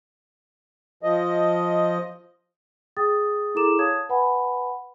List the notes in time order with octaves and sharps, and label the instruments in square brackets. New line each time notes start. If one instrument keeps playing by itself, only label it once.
[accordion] F3 D#5
[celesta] G#4 G5 D#6 A6
E4 G#4 A4 A#5 D6 E7
C#5 F5 A5 D#6 G#6
B4 F#5 G#5 B5